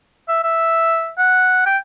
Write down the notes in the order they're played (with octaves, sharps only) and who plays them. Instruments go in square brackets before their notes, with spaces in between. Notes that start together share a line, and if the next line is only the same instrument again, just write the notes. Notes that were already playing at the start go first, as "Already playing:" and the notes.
[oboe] E5
E5
F#5
G5